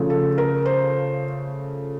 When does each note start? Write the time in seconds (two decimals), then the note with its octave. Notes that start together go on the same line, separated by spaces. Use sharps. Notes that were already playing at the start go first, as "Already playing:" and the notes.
Already playing: C#3 F3 A3
0.10 A4
0.38 A#4
0.66 C5